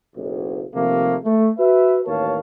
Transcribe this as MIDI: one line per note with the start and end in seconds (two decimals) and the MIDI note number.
0.16 0.64 30
0.16 0.64 35
0.74 1.15 39
0.74 1.15 48
0.74 1.15 53
0.74 1.15 57
0.74 1.15 58
1.25 1.49 57
1.58 2.00 66
1.58 2.00 71
1.58 2.00 76
2.06 2.37 33
2.06 2.37 39
2.06 2.37 70
2.06 2.37 73
2.06 2.37 77
2.06 2.37 81